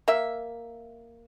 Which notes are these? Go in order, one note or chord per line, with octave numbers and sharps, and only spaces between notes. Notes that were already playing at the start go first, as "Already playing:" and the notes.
A#3 E5